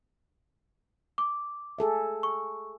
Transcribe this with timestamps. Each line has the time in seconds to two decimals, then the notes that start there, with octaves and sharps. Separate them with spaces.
1.18 D6
1.79 G#4 A4 E5
2.23 C#6